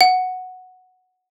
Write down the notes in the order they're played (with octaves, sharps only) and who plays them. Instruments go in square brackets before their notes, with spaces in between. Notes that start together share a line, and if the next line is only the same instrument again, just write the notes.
[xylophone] F#5